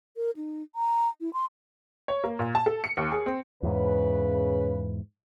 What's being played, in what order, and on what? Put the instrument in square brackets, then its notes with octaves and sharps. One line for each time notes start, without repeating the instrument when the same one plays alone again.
[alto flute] A#4
D#4
A#5
E4
C6
[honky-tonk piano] C#5
A#3
A#2
A5
A4
C#7
D#2
G#4
C4
[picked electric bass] E2 G#2 [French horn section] C#3 B4